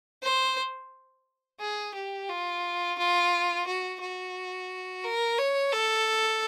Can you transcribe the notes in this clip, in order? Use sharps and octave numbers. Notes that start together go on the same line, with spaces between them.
C5
G#4
G4
F4
F4
F#4
F#4
A#4
C#5
A4